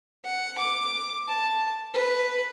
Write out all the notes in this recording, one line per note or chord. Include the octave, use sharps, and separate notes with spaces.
F#5
D6
A5
B4